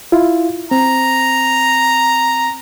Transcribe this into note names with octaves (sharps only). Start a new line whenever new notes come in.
E4 F4
C4 A#5